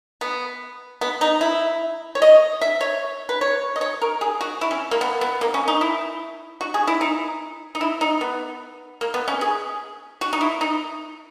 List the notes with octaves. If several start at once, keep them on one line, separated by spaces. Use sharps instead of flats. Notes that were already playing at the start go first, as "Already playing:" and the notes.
B3
B3
D#4
E4
C#5
D#5
E5
C#5
B4
C#5
D#5
C#5
A#4
G#4
F#4
E4
C#4
A#3
B3
B3
A#3
C#4
D#4
E4
F#4
G#4
E4
D#4
D#4
E4
D#4
B3
A#3
B3
C#4
G#4
F#4
D#4
E4
D#4